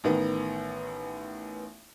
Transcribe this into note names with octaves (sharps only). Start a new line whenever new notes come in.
A1 D#3 B3